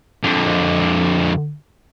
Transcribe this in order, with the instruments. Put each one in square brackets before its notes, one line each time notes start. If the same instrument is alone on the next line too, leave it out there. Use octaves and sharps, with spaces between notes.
[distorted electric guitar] F2 D3